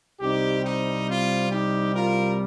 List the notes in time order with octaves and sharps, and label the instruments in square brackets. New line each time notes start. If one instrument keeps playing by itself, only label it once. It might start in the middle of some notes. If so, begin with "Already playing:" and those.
[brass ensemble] C2 C3 G3 C4 D#4 G4
D#4
C4 F4
D#4 G4
F4 A#4